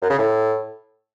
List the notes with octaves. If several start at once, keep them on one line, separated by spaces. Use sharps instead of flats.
F#2
C#3
A2